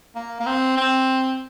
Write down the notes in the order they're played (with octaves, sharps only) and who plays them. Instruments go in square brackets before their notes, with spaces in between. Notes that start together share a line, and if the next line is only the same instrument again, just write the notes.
[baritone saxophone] A#3
A#3
C4
C4